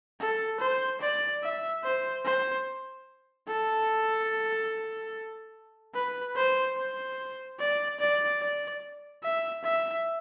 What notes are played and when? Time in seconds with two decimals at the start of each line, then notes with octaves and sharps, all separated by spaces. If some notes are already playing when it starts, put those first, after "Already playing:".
0.20 A4
0.60 C5
1.01 D5
1.43 E5
1.84 C5
2.25 C5
3.48 A4
5.94 B4
6.36 C5
6.78 C5
7.59 D5
8.00 D5
8.41 D5
9.23 E5
9.64 E5